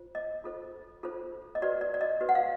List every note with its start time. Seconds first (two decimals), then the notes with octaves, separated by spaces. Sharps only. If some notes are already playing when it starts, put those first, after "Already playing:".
Already playing: F4 C5
0.15 D#5
0.44 F4 A4 C5
1.03 F4 A4 C5
1.55 D#5
1.62 F#4 B4 D5
1.81 D5
1.94 D5
2.01 D#5
2.21 F#4 B4
2.29 F#5
2.35 F5